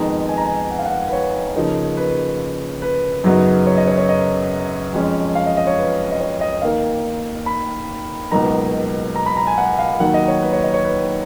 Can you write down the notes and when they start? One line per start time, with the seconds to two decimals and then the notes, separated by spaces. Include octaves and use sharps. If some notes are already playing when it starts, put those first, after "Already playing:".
Already playing: F2 D#3 G#3 B3 D#4 A#5
0.29 G#5
0.37 A#5
0.45 G#5
0.71 F#5
0.79 F5
0.86 F#5
1.08 B4
1.13 C#5
1.56 C#3 F3 A#3 D#4
1.97 B4
2.82 B4
3.24 F#2 C#3 F#3 B3 D#4
3.67 C#5
3.77 D#5
3.87 C#5
3.98 C#5
4.09 D#5
4.93 F2 F3 G#3 C#4
5.35 F5
5.46 D#5
5.57 D#5
5.67 C#5
5.78 B4
6.12 D#5
6.20 C#5
6.41 D#5
6.62 D#2 D#3 A#3 F5
7.46 B5
8.31 C#2 B2 F#3 A#3 D#4 A#5
9.16 A#5
9.26 B5
9.37 A#5
9.47 G#5
9.58 F#5
9.79 F5
10.00 D#2 D#3 F#3 F#5
10.14 D#5
10.28 C#5
10.42 B4
10.53 C#5
10.64 D#5
10.74 C#5
10.84 B4